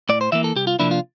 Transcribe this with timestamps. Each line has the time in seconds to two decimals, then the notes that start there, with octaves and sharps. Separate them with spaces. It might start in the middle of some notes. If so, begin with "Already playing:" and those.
0.09 A2 D5
0.21 C5
0.32 E3 A#3 E5
0.44 A4
0.56 C2 G4
0.67 F4
0.79 C3 F3 A#3 D4 E4
0.91 F4